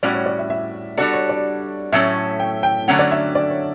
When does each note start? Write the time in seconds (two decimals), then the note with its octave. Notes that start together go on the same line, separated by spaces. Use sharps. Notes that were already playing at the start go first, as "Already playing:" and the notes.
0.03 A2 G3 C#4 F#4 D5
0.14 C#5
0.26 D5
0.39 E5
0.50 E5
0.97 G3 D4 F#4 A4 D5
1.13 C#5
1.29 D5
1.92 A2 F#3 A3 C#4 E5
2.40 G5
2.63 G5
2.88 D3 F#3 A3 C#4 F#4 F#5
2.99 D5
3.11 E5
3.35 D5
3.51 C#5